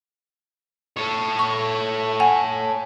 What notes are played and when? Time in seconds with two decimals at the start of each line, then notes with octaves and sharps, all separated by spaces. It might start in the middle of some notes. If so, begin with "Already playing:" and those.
0.97 A4 C#5
1.39 C#6
2.20 F#5 G#5